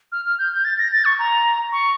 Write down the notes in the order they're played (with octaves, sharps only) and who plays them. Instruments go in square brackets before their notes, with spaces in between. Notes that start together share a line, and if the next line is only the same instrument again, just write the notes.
[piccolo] F6
F6
G6
G6
A6
A#6
A6
C#6
A#5
C#6